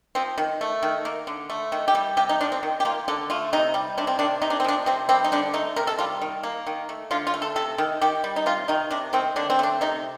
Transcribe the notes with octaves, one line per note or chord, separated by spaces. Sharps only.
F3 C4
D#3
A3
D#3
A#3
D3
A3
D#3
G4
G3
C3 G4
D#4
F3 D4
C4
D#3
G4
A#3 F4
D3 A4
A3 F4
C3 D#4
G3
C3 D4
C4
D#3 D4
C3 D#4
D4
C4
F3 D4
C3 C4
G3 C4
D#4
D3 D4
A3 D#4
C3 A#4
A4
G3 F4
D#3
A#3
D#3
A3
D3 F4
F4
A3
A4
C3 A4
D#3
D#3 G4
G3
D#4
C3 F4
D#3 D#4
C3 D4
D#3 C4
D3 D4
C4
A3 D4
C3 D#4